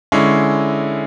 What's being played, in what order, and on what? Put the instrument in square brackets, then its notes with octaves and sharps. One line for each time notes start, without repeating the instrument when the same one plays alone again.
[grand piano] D3 G#3 C#4 E4